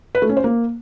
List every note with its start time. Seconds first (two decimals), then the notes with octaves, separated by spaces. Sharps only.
0.15 B4
0.22 A3
0.29 C#4
0.37 C5
0.44 A#3